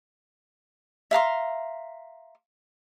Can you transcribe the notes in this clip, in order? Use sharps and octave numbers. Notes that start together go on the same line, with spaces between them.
E5 F5 A#5 C6